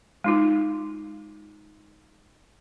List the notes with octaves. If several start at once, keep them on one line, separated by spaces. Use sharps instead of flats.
G#3 D#4 F4